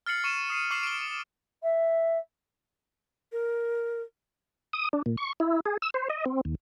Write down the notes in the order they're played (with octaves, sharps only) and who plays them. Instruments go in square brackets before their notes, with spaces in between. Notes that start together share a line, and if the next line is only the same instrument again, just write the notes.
[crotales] F6 A6 C7 C#7 F#7
C#6 C#7 D#7 E7
D#6 C7 D#7
C#6 D6 F6 C7 F#7
D7 G7
[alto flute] E5
[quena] A#4
[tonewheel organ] D#6
D4
A#2
C#6
E4
G#4
E6
C5
D#5
C4
D#2